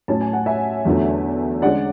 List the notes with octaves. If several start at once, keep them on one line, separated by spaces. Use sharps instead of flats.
A2 F#3 C#4 A5
G#5
F#5
E5 G#5
E2 D3 F#3 A3
D3 G#3 C#4 D5 F#5